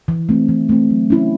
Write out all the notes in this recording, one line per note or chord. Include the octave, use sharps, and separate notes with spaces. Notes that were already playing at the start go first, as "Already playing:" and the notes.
E3
A3 C4
E3
A3 C4
F#3
C#4 E4